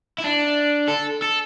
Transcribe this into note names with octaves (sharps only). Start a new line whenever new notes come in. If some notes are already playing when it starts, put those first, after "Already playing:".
E4
D4
A4
A4